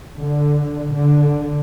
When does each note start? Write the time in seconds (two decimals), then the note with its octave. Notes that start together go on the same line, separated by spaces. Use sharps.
0.18 D3
0.93 D3